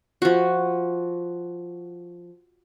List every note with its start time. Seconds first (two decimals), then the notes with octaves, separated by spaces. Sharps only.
0.22 F3 F#4